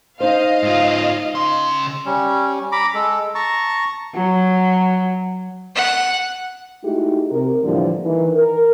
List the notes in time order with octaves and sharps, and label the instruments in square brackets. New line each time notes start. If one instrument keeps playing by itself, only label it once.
[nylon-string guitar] D#4 C5 [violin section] D#5 F5
[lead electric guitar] G#2 F4
C#3 C6
[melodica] G3 C#4
A#5 B5 D6
G#3 A4
A5 A#5 C#6
[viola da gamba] F#3
[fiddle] F#5
[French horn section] G#3 A3 D#4 E4 F#4 G4
C3 A#4
A2 D3 E3 F3 G3 A#3
D#3 E3
A#4